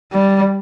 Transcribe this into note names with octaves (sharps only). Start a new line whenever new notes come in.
G3